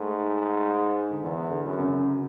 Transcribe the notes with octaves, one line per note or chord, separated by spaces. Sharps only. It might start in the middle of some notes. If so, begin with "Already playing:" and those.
Already playing: G#2 A3
D3
E2 E3
D3
F#2
C#3